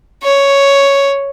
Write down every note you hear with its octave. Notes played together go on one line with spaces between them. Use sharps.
C#5